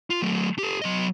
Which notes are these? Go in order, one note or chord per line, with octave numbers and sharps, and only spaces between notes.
F4
F#3 A3
G4 A4
F#3 D#5